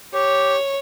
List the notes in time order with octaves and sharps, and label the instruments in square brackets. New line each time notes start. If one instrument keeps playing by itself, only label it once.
[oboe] G4 [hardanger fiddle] C#5